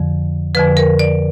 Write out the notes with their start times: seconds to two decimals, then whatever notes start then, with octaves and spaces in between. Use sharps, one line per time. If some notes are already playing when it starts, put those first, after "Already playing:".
Already playing: F2 D3 F3
0.55 F2 D3 F3 B4
0.77 A#4
0.99 D5